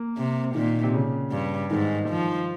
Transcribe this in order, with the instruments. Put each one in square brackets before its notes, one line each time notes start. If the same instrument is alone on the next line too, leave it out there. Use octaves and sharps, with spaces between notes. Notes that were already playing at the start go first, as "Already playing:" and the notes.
Already playing: [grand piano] A#3
[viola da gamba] C3
[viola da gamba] A#2 [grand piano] D#3
[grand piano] C3
C#3
[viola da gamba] G2
[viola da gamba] G#2 [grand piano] D#3
[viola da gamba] F3